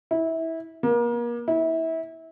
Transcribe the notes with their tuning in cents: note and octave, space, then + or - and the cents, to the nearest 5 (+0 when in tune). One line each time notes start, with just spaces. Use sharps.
E4 -20
A#3 +35
E4 -25